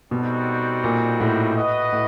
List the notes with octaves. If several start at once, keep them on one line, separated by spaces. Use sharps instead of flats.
B2 G3 C4 D#4 F#4 A4
A#2
A2
F#4 B4 D#5
A2